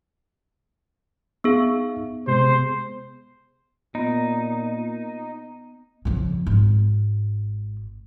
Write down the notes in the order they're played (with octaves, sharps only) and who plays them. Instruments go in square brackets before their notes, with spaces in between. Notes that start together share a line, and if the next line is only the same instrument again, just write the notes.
[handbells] B3 G#4 [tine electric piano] D#4 F5
[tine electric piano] C3 G#3 [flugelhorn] C5
[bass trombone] A#2 [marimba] B3 [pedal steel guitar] D#4
[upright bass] F2 C#3
G#1